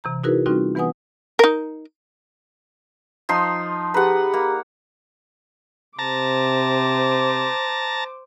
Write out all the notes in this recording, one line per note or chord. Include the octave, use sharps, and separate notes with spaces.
C3 E3 A#5
D#4 E4 F#4 G#4 A#4 B4
G3 C4 C#4 D#4 F4 F#4
E3 B3 B4 F#5 G#5 D#6
D#4 A#4
F3 D#4 C6
G4 G#4 B4 F#5 A#5
A#3
C3 C5 A5 A#5 D6